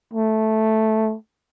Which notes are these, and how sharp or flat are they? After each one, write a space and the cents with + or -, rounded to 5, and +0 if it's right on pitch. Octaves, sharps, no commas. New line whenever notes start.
A3 -5